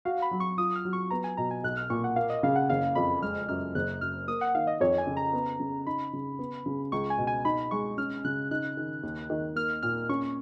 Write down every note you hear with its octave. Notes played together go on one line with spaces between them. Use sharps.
F#4 F5
B5
F#3
C#6
F4 D#6
F6
F#3
C#6
B3 A#5
G#5
B2 A#5
G#5
B1 F#6
F6
A#2 C#6
F#5
A#3 F5
D#5
C#3 F5
F#5
F#1 F5
F2 B5
G#3 F6
F#2 F6
F#1 F#6
F#2 F6
A#3 D#6
F#5
D#3 F5
D#5
F2 C#5
G#5
C#3
A#5
B3
C#3
D#4 B5
C#3
B3
C#3
C#2 C#6
G#5
B2
G#5
D#4 B5
G#3 C#6
C#4 F6
C#3 F#6
D#4 F#6
D#3
D#2
D#3
A#3 F6
A#2 F6
C#4 C#6